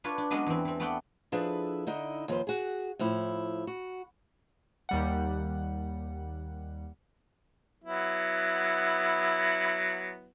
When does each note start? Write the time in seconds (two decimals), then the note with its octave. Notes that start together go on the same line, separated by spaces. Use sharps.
0.04 D4 F4 B4 C#5
0.18 D4
0.31 F#3 G#3 B3 C#4 D4
0.46 E2 E3 C4
0.65 E3 C4
0.80 A3 B3 C4 D5 F#5 G5
1.32 F3 D4 E4 G#4 A4 B4
1.87 D3 D#4 E4 D#5
2.28 D#2 F3 B4 C5
2.47 F#4 G#4
2.99 A2 F3 E4
3.67 F#4
4.89 D#2 G3 F#5
7.84 F#3 B3 E4